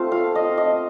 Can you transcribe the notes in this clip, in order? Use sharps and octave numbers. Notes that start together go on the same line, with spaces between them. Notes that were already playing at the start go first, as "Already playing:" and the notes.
Already playing: A3 C4 F4 A5
F5
D#5
D#5